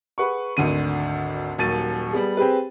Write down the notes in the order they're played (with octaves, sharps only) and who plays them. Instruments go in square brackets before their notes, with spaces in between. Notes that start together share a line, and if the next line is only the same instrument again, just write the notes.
[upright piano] G#4 B4 F#5 C#6
G#1 D2 D3 D#7
D#1 D#2 F#3 A6 D#7
G3 B3 G#4
C4 G4 G#4 B4